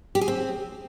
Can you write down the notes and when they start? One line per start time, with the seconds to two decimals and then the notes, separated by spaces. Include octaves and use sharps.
0.15 G4
0.21 G#4
0.28 C4